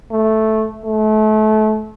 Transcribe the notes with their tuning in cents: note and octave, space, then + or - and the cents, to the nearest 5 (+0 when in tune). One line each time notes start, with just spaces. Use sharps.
A3 -5
A3 -30